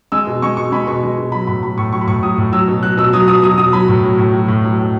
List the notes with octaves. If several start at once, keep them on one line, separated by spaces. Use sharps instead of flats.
G#3 E6
B2
G#3 C#6
B2 C#6
G#3 B5
B2 C#6
G#3
B2
F#3 B5
A2 B5
F#3 B5
A2 C#6
F#3 C#6
B5
A2 C#6
F#3 D#6
A2
F#3 E6
B2
F#3 F#6
B2 E6
F#3 D#6
B2 D#6
F#3 D#6
B2 D#6
F#3 B5
A2
F#3
A2
F#3
A2
F#3
A2